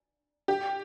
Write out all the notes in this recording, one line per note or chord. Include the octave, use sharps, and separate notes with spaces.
G4